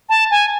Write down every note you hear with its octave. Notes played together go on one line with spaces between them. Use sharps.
A5
G#5